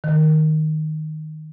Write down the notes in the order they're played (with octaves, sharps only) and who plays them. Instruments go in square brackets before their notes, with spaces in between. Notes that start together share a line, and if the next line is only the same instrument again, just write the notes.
[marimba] D#3